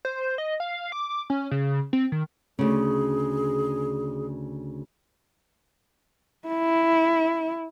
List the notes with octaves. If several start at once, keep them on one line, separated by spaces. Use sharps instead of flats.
C5
D#5
F5
D6
C#4
C#3
C4
D#3
D2 C#3 G#4
E4